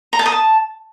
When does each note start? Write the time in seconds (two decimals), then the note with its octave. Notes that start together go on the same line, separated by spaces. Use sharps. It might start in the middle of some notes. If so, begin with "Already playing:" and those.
0.13 A#5
0.19 A5
0.26 D#6
0.32 A5